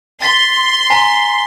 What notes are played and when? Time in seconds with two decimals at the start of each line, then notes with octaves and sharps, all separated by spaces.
0.22 C6 A6 B6
0.90 G#5 A#5 B6